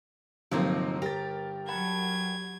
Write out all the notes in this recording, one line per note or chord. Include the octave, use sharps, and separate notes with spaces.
G1 C3 F3 F#3 A#3 C4 D#4
G4 A#4 A#5 A6
F#3 F#5 A5 B5 G#6